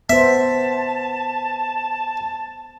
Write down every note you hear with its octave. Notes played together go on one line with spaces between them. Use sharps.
B3 C5 E5 A5